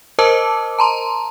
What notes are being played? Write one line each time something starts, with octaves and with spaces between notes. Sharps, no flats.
A#4 C5 D#5 A5 D6 E6
A5 A#5 C6